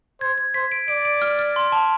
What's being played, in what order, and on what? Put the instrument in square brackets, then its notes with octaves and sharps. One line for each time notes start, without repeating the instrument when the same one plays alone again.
[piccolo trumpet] C5 [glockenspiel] G#6
[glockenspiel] G#6
[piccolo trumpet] C5 [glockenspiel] B6
[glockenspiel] D7
[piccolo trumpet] D5 [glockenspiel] D7
[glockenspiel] D7
F6
F6
C6
A5